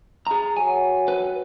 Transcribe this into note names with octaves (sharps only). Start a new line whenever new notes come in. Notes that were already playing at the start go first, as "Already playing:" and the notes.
G#4 A#5
F#3 G#5
A4 B4 G5